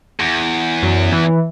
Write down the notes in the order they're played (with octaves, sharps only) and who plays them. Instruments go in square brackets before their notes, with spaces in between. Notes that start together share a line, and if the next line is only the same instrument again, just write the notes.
[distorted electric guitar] E2
[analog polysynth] F#2
E3